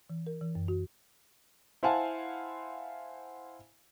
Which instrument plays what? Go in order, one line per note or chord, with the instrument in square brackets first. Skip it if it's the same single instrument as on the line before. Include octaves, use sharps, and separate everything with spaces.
[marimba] E3
A#4
E3
F#2
F#4
[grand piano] E4 C5 F5 F#5 G#5 A5